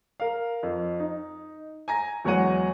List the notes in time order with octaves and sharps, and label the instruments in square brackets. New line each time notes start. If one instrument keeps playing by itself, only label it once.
[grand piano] A#4 F5
F2
D#4
G#5 A#5 A#6
E2 F#3 G#3 C#5 F#5 D#7